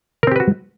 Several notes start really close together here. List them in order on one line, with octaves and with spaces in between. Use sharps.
A#4 C4 G4 B4 F#4